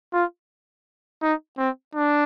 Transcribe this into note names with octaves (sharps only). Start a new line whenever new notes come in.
F4
D#4
C4
D4